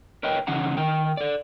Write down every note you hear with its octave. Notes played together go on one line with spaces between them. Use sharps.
A#4 B4 C#5 D#5 G5
C#3 E3 C#4 D#4 F#5 A#5
D#3 A#4 G5
A4 D5